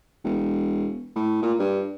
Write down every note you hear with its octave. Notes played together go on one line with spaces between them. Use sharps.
E1
A2
A#2
G2